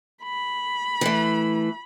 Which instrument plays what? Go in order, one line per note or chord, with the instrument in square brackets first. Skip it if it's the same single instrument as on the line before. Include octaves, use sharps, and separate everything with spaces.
[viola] B5
[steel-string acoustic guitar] E3 A3